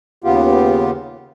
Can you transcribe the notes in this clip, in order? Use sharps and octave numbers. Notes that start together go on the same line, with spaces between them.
D#2 C#3 B3 F4 G4